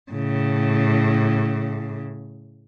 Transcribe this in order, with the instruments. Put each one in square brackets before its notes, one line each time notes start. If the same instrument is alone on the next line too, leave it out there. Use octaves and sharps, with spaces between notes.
[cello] A2 C#3